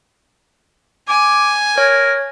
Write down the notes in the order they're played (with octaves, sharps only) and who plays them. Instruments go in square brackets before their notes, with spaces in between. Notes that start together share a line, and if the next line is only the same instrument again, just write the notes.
[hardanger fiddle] G#5 [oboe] D6
[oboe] A#4 [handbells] C#5